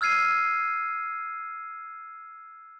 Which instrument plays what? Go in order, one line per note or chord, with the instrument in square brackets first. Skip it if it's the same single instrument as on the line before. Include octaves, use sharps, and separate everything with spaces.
[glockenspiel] E6 F6 G#6 C7 D#7